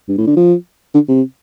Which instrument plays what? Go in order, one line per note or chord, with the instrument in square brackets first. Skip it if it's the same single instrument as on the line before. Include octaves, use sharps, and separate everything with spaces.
[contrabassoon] G2
A2
D3
F3
D3
C3